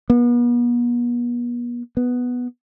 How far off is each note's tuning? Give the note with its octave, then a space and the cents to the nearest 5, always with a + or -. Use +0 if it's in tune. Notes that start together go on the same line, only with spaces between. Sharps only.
B3 -40
B3 +0